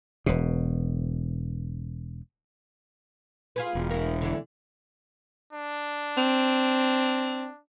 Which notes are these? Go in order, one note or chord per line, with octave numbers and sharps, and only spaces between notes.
E1 B2
F4 G#4 B4
E1
E4 A#4
D3 E3
D4
C4